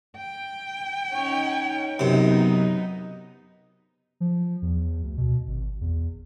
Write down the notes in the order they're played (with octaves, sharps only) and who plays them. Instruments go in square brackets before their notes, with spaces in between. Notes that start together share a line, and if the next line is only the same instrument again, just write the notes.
[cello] G5
[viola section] C#4 D#4 C#5
[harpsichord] F#2 C3 [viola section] B3 D#4
[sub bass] F3
E2
D2
B2
G#1
E2